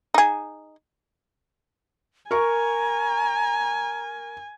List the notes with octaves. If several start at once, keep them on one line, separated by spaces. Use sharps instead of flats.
D#4 G#4
A#4 G#5 A#5 C#6